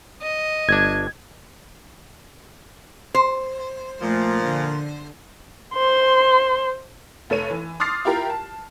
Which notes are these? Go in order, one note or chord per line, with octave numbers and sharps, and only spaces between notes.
D#5
G1 D4 G#6
C5
A#2 F3 A3
D3
C5 C6
F1 A3 C#5 D#7
E3
C6 D6 D#6 F6 A6 C7
E4 F4 G4 A#4
A5